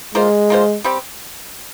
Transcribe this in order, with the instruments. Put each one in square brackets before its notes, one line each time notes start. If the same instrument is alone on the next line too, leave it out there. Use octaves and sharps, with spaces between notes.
[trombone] G#3 [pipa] A#3 F4 C5
[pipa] A#3 F4 C5
G3 C4 G4